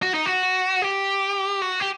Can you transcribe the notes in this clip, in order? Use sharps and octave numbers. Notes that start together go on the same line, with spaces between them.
F#4
D#4
F#4
G4
F#4
G4